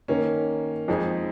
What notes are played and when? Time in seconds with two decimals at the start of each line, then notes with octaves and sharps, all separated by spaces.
0.08 D#3 A#3 C#4
0.88 F2 F3 G#3 D#4 G#4